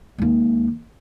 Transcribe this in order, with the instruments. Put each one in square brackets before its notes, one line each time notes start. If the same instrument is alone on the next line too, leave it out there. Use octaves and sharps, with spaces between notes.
[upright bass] D#2 G#3